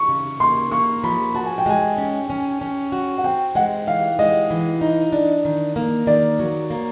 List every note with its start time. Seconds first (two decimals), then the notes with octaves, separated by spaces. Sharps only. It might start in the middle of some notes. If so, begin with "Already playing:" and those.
Already playing: C#6
0.09 C#3
0.40 A#3 C6
0.71 A#3 C#6
1.04 F3 B5
1.35 F#4 A5
1.46 G#5
1.58 G5
1.66 G#3 G#5
1.98 C#4
2.30 C#4
2.61 C#4
2.92 F#4
3.18 F#5
3.24 C4 G5
3.55 G#3 F#5
3.87 E3 F5
4.19 G#3 D#5
4.50 E3
4.81 D#4
5.12 D4
5.45 D#3
5.76 A#3
6.07 D#3 D5
6.39 F#3
6.70 A#3